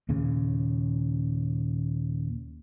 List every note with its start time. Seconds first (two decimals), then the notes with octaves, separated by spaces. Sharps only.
0.09 D#2 A#2 C#3